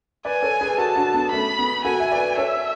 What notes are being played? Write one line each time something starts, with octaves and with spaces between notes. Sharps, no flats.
B4 D5 G#5
A4 C#5
G#4 B4
F#4 A4 A5
D4 F#4
B3 D4
A3 C#4 B5
B3
F#4 A4 G#5
E5
B4 D5
A4 C#5 E5